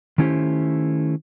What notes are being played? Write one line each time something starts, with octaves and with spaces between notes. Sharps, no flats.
D#3 A3 C#4 E4 G4 C5